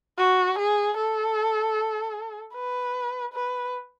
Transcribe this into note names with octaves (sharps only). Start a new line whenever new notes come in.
F#4
G#4
A4
B4
B4